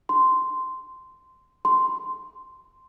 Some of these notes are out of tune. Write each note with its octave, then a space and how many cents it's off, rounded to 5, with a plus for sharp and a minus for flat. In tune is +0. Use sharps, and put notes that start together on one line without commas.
C6 -10
C6 -5